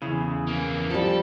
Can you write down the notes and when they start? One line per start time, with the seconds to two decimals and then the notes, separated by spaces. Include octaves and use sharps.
0.02 E2 C#3 E4
0.47 E3 A#3
0.91 F3 G3 A4